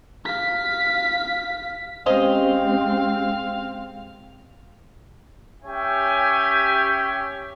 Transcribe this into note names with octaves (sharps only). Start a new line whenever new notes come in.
F5 B6
G#3 C4 C#4 G4 G#4 C5 D#5 F5
C#4 G4 C#5 E5 G5 G#5